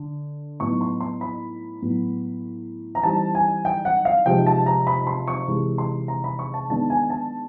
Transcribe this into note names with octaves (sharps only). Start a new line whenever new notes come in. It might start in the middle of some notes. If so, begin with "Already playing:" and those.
Already playing: D3
A2 F#3 B3 D#4 C#6
C6
C6
B5
A2 F#3 B3
A#5
E3 G3 C4 D#4 A5
G#5
G5
F#5
F5
C3 F3 G#3 C4 D#4 G5
A5
A#5
B5
C6
C#6
C3 E3 G#3
C6
A#5
B5
C#6
A5
D#3 G#3 B3 D4 A5
G#5
A5